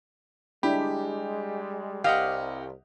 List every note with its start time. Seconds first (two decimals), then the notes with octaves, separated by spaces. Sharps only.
0.63 G3 G#3 D4 E4 G4 B5
2.04 C2 G4 D#5 F5 F#5